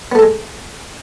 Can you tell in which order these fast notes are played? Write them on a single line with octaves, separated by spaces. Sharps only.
B3 A3 A4 G#3